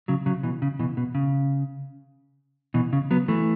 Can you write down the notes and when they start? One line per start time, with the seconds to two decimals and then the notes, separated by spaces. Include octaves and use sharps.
0.08 C#3 F#3
0.26 C#3 F#3
0.43 B2 E3
0.62 C#3
0.79 B2 E3
0.97 B2
1.15 C#3
2.74 B2 E3
2.93 C#3
3.11 F#3 B3
3.28 E3 A3